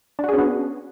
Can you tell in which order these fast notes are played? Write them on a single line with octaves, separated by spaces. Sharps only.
D4 F#4 G#4 C#4 B3